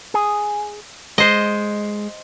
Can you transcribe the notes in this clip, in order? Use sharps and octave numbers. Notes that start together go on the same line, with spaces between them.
G#4
G#3 C5 D#5